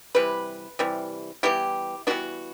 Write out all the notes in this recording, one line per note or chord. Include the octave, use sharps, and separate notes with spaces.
C3 E3 G3 B4
C3 E3 G3
E3 G3 B3 E4 G4
E3 G3 B3 D4 F#4